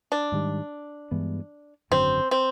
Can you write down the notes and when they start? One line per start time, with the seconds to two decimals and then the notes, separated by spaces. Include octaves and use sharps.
0.12 D4
0.32 G#2 D#3 G3
1.11 G2 E3 G#3 B3
1.91 G#1 F#2 D3 F#3 C4
2.31 C4